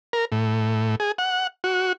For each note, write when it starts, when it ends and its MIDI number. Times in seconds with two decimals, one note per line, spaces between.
0.13 0.25 70
0.32 0.95 45
1.00 1.12 68
1.18 1.47 78
1.64 1.93 66